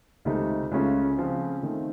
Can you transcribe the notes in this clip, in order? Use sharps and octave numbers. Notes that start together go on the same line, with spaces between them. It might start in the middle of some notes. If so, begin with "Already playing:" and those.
C#2 C3 D#3 A3 D#4
C#2 C#3 A3 C#4 F4
C#3 F3 C4
D#3 A3 C4